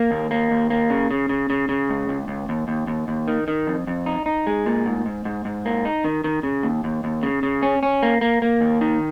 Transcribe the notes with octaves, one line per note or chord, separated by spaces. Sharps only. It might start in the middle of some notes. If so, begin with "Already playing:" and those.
Already playing: A#3
D#2
A#3
D#2
A#3
C#3
C#3
C#3
C#3
C#3
C#2
C#2
C#2
D#2
D#2
D#2
D#2
D#3
D#3
F2
F2
D#4
D#4
G#3
A#2
G#2
G#2
G#2
G#2
A#3
D#4
D#3
D#3
C#3
D#2
D#2
D#2
C#3
C#3
C#4
C#4
A#3
A#3
A#3
D#2
D#3